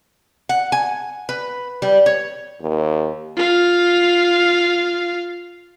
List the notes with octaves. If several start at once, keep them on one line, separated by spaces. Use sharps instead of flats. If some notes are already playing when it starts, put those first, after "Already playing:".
F#5
G#5
B4
G3
C#5
D#2
F4 F5